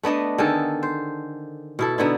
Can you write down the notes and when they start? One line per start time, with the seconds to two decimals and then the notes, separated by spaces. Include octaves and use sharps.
0.03 A3 B3 D4 D#5
0.38 D3 D#3 G#4 A4
0.83 C5
1.79 B2 E4 A4
1.98 D3 B3 D#4 E4